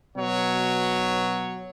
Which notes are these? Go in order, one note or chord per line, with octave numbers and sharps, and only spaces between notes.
B2 F#3 C#5